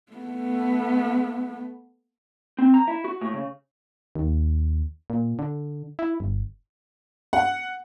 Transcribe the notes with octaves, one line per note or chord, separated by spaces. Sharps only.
A3 B3
C4
A#5
E4
F#4
A2
C#3
D#2
A#2
D3
E4
G1
F#5